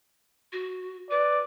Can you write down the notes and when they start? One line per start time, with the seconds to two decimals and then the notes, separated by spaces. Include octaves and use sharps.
0.52 F#4
1.11 B4 D5